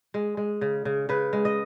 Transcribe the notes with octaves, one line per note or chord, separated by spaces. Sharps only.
G#3
G#3
C#3
C#3
C#3 B4
G#3
D#5